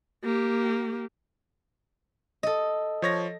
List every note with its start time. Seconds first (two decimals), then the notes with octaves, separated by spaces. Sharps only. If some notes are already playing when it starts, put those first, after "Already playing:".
0.24 A#3 G4
2.43 A4 D#5
3.02 F3 C#5 A#6